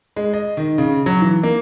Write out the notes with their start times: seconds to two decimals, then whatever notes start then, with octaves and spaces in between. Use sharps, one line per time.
0.16 G#3
0.33 D#5
0.57 D#3
0.78 C#3
1.06 F#3
1.22 E3
1.43 A#3